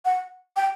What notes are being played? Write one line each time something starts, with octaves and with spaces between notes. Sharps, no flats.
F#5
G5